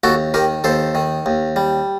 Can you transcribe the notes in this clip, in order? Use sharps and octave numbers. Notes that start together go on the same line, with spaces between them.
D#2 F#4 A4
D#3 G4 A#4
D#2 A4 C5
D#3
D#2
G3